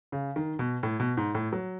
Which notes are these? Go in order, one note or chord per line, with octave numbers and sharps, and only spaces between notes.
C#3
D#3
B2
A2
B2
G#2
A2
F#3